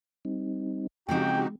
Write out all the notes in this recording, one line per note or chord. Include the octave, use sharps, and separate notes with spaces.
G3 C4 D#4
C#3 F3 G#3 C4 D#4 F#4 G4 G5